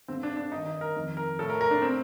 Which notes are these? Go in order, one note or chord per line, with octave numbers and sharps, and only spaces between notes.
G2 D3 C4
D4
D4
G2 D#3 D#4
D#4
A#4
F2 D#3
A#4
A2 A4
A#4
A#4
D4
A2 C4